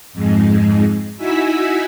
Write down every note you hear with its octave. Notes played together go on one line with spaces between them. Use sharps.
F2 G#2 G#3
D#4 E4 F#4 G#5 E6 B6